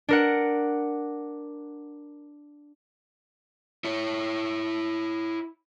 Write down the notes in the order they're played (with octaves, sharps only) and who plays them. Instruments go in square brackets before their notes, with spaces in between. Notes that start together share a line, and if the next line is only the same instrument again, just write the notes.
[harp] D4 A#4 F#5
[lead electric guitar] E4 C#5